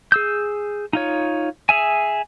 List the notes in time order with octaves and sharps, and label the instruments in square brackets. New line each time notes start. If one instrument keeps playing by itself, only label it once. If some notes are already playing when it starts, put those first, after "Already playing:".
[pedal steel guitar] G#4 E6 G6
D#4 F4 C#5
G#4 E5 G#5